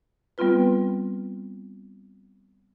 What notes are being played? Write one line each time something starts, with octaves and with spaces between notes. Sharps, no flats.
G3 B3 C4 F4 B4